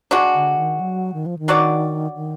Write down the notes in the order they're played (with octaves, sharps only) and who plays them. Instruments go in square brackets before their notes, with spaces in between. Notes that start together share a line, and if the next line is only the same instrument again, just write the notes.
[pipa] G#3 D4 F#4
[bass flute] D3
D#3
F#3
D#3
F3
D#3
[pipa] F#3 D4 F#4 D5
[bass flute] D#3